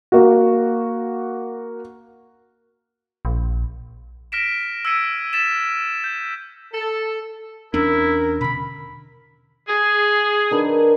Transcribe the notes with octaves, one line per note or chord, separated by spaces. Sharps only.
A#3 F#4
A#1
F6 A#6 B6 D7 E7
E6 F6 G#6 B6 C#7 D#7
A6 B6 E7
G6
A4
E2 C#4 D4 E4 A#4
B2 D3 B5
G#4
D#3 D4 B4